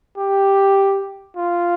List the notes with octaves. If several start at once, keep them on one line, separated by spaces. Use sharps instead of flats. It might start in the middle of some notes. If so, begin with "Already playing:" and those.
G4
F4